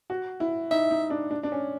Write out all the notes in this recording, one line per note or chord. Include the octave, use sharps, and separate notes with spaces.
F#4
E4
D#4 E5
D#4
D4
D4
D4
C#4